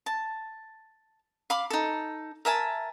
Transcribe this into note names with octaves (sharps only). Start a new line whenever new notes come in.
A5
F5 B5 D6
D#4 A4
A#4 E5 G#5 A5